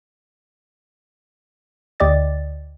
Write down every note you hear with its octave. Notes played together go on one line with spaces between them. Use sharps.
D2 G4 D5 D#5 A6